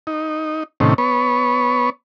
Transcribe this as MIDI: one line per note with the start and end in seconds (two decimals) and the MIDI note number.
0.07 0.63 63
0.80 0.94 45
0.80 0.94 48
0.80 0.94 51
0.80 0.94 61
0.98 1.90 59
0.98 1.90 73